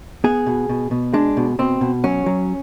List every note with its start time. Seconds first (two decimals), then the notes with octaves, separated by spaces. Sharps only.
0.24 B3 G#4
0.46 B2
0.69 B2
0.91 B2
1.14 G#3 D4
1.37 B2
1.59 B2 C4
1.81 B2
2.04 F#3 C#4
2.26 F#3